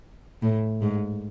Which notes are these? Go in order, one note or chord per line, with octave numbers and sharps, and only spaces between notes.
A2
G#2